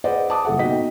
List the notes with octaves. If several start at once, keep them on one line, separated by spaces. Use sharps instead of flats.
G#4 B4 C5 D5 D#5 F#5
B4 A5 D6 D#6
F#1 G3 A4 E5 F#5
B2 D#4 F#4 D#5 G5 B6